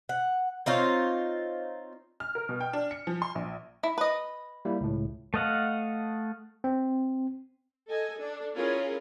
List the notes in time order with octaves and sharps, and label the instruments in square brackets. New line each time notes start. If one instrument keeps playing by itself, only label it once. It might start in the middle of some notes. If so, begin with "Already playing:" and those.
[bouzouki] F#5
C4 D#4 F4 C#5
[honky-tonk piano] F6
A#4
B2
G5
D4
C#7
F3
C6
A#1
[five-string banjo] E4
B4 D#5
[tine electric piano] G3 A#3 E4
C#2 A2
[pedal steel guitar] A3 A4 D#5 F5 F#5
[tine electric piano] C4
[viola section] A4 D#5 G#5
D4 A4
C#4 E4 F4 G#4 A#4